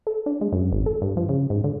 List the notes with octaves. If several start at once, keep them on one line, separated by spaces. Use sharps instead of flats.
A4
D4
G#3
F#2
G#1
A4
G2
F3
C#3
G#2
D3